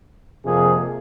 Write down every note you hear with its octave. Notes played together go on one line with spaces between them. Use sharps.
F2 C3 F3 A#3 G#4